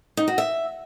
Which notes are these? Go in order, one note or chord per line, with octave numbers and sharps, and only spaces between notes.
D#4
F#4
E5